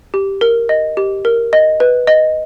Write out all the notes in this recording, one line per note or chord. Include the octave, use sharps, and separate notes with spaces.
G4
A#4
D#5
G4
A#4
D#5
B4
D#5